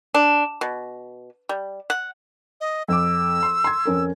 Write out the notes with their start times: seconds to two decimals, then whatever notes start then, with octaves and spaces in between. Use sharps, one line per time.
0.14 D4
0.61 B2
1.49 G3
1.90 F#5
2.61 D#5
2.88 F2 D6 E6
3.43 C6
3.64 C6 G#6
3.85 F2 C#4 A#4